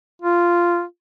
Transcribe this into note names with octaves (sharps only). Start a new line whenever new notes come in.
F4